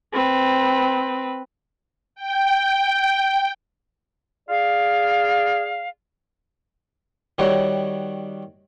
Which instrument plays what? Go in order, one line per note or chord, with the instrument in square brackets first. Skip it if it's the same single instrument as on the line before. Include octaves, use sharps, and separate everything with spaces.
[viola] C4 B4
[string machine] G5
[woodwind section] G#4 D5 F5
[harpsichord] D#3 G3 F#4 C#5